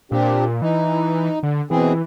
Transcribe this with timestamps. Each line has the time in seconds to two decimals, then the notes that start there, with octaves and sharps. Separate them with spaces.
0.12 A#2 C4 D4 G4
0.62 E3 D#4
1.43 D3
1.71 B2 E3 C4 G#4